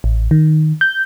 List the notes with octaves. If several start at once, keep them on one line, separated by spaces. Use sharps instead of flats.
A1
D#3
G6